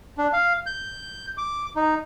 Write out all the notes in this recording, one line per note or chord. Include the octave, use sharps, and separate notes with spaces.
D4
F5
G6
D6
D#4